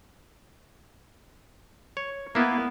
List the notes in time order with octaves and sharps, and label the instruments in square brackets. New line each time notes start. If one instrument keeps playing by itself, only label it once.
[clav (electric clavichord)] C#5
[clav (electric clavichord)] A#3 E4 [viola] B3